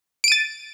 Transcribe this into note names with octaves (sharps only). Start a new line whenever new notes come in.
A6 D7 D#7